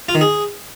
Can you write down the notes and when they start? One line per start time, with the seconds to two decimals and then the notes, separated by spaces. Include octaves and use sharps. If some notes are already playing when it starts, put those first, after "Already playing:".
0.09 F4
0.15 D#3
0.21 G#4